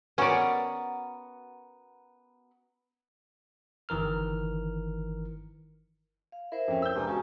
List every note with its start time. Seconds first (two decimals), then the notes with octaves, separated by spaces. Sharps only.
0.18 B3 C#4 F#4 A#4 D5
3.89 G1 D#3 E3 A#4 F6
6.32 F5
6.52 E4 A#4 C5
6.68 F2 C#4
6.82 E6 G6
6.96 E1 G2 G#5 A#5
7.07 C#3 F#4 G#5 A5